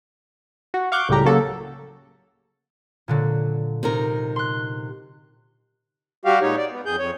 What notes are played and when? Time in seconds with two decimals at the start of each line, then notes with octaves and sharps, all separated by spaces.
0.74 F#4
0.92 F5 C#6 D6 F#6 G6
1.09 C#2 A2 C#3 G3 G4 A#5
1.25 C#3 F#3 A#3 F#4 A4
3.08 A#2 D3 F#3
3.83 C3 D#4 A#4
4.36 C6 F#6
6.25 G3 F#4 G4 F5
6.42 A#2 G#3 D#4 C#5
6.58 D5
6.71 B3
6.86 F2 G#4 G6
6.99 F2 C#5